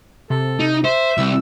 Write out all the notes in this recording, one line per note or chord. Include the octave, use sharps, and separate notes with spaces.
C3 A4
D#4
C5 E5
C2 E6